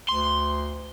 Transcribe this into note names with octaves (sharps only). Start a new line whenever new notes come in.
D2 C6